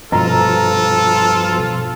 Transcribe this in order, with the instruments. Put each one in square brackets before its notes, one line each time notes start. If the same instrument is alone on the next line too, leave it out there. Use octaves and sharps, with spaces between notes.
[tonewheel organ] G2 B2 F3 [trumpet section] F4 A4 [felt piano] A#5